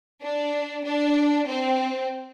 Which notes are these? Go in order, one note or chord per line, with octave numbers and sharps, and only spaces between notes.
D4
D4
C4